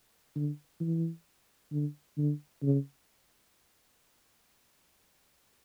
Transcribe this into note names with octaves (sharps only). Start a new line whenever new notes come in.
D3
E3
D3
D3
C#3